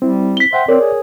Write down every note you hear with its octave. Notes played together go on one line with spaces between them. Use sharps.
G3 C4 E4
B6 G7
C5 E5 F#5 G5
C4 A#4 C#5 D5
G#4